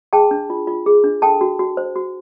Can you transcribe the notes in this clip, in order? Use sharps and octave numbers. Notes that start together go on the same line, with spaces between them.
G#4 G5 A5
D4
F4
F4
G#4
D4
A4 G5 A5
F#4
F#4
C5
F#4